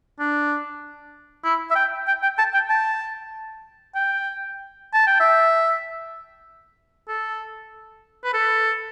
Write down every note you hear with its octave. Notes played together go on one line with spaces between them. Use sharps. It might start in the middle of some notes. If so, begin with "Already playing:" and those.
D4
E4
E5
G5
G5
G5
A5
G5
A5
G5
A5
G5
E5
A4
B4
A4